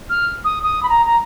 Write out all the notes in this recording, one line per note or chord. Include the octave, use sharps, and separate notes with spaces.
F6
D#6
D#6
B5
A#5
A#5